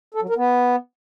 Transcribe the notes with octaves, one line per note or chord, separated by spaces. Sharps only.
A4
F#3
A#4
B3